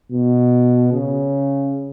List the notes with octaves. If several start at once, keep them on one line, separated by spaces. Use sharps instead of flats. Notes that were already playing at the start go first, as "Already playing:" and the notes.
B2
C#3